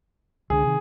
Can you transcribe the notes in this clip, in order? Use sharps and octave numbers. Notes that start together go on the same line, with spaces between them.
C#2 D3 G#4
C3 D#3